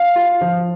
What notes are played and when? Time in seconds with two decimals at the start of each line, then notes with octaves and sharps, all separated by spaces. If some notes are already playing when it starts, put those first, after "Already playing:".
Already playing: F5
0.16 F4
0.41 F3